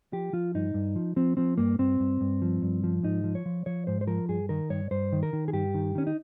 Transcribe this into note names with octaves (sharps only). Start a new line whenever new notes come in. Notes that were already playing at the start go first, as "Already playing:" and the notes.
F3 G4
F3 F4
G2 D#4
G2
F3
F3 C4
F3 C4
G2 A#3
G2 C4
G2
G2
F3
G2
F3
G#2 D#4
F3
C#5
F3
F3 C#5
G#2 C5
C5
F3 A#4
G2 G#4
D#3 A#4
G2 C#5
G2 C5
D#3
A#4
D#3
G#4
G2 G4
D#3
D#3 C#4
D#4